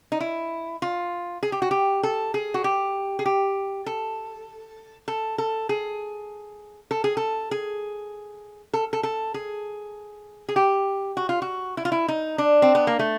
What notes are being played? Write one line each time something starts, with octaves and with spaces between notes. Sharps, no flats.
D#4
E4
F4
G#4
G4
F#4
G4
A4
G#4
F#4
G4
G#4
G4
A4
A4
A4
G#4
A4
G#4
A4
G#4
A4
A4
A4
G#4
G#4
G4
F#4
F4
F#4
E4
F4
E4
D#4
D4
C4
B3
A#3
A3